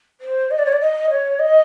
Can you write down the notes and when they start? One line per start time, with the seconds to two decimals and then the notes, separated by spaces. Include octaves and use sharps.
0.20 C5
0.50 D#5
0.58 D5
0.65 C#5
0.72 D5
0.80 D#5
1.10 C#5
1.39 D#5